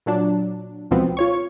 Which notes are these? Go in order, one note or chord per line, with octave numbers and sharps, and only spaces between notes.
A#2 F#3 D4
C#2 B2 F3 B3 C4
F4 C#5 C#6